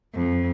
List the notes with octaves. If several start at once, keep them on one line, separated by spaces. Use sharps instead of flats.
F2